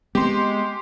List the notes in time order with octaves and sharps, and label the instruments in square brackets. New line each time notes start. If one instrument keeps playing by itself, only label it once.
[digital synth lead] G#3 [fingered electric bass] B3 C4 [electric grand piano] G4 C6